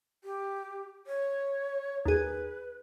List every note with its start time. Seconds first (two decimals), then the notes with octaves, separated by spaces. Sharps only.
0.24 G4
1.07 C#5
2.05 D#2 G#4 B4